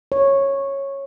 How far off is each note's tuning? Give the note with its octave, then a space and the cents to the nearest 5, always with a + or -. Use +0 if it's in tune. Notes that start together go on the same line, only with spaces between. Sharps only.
C#5 -10